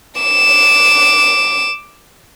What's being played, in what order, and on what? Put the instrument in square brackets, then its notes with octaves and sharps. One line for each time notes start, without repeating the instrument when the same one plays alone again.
[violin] D6 E7